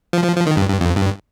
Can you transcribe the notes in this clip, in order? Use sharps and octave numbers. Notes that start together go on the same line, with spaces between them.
F3
F3
F3
D#3
G2
G2
F2
G2